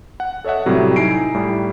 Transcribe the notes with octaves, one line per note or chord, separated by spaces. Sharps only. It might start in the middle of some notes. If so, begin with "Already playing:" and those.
F#5
A4 C#5 D#5 E5 F#5
A2 C3 F#3 G3 A3
D#4 E4 G#5 A#5 C7 D7
A2 G3